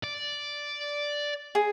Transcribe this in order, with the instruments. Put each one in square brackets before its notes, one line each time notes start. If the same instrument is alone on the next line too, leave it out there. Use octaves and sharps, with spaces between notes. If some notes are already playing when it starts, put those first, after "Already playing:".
[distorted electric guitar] D5
[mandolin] G#4